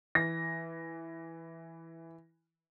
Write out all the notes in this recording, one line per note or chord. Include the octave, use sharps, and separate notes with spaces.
E3 A#6